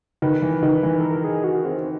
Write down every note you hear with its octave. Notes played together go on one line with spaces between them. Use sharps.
D#3 B4
E3
D#3
E3
A4
A#4
G#4
F#4
C4